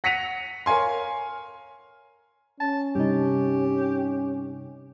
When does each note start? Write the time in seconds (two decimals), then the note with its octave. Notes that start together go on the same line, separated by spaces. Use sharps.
0.04 F#5 A#6 B6 C#7 D#7 F7
0.66 A#4 C#5 F5 G#5 C6
2.60 C#4 A5
2.95 G2 C3 D#4 G4